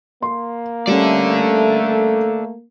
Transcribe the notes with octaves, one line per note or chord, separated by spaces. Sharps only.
A#3 C6
G3 A3 C#4 A4 D5